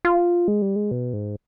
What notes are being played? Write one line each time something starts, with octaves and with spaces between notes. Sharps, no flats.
F4
G#3
G3
G#3
B2
G#2